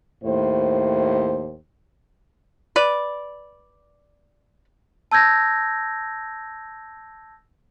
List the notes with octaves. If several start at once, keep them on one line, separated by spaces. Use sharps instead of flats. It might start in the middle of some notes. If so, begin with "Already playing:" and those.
D#2 A2 C5
B4 D5
A5 E6 G6 G#6 A#6